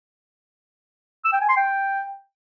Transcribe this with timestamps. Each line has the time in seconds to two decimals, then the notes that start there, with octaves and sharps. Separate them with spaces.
1.25 E6
1.33 G5
1.41 G#5
1.49 C6
1.57 G5